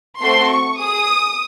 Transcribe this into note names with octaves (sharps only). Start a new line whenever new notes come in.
A3 C4 F#4 A4 C6
C#6
G#4 D#6